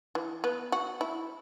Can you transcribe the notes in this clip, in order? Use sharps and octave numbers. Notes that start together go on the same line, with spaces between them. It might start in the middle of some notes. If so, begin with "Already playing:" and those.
E3
B3
F#4
E4